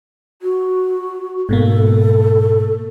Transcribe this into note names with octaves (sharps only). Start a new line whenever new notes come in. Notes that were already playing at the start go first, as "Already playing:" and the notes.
F#4
G#2 B2 A#3 A4